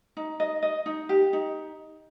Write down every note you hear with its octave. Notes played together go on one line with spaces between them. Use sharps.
D#4
D#5
D#5
D#4
G4
D#4